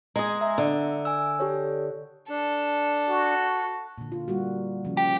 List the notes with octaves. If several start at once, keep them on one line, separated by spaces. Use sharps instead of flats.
G#3 G#4 A#5
E5 A#5
D3
G#5 E6
G4 A4 C#5
D4 A4
F#4
A#2 D3
F4
G3 A#3 F#4
C#3 F3
G4